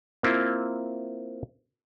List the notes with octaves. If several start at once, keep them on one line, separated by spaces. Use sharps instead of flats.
A#3 C4 E4 F4